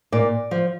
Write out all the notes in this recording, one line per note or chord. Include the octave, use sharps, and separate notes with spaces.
A#2 D5
F3